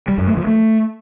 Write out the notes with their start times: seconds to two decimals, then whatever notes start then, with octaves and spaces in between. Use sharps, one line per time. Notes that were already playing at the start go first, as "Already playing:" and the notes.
0.08 G3
0.18 F#2
0.27 A3
0.37 F3
0.47 A3